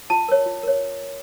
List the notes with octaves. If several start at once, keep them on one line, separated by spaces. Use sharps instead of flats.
F4 A5
A#4 C#5
F4
A#4 C#5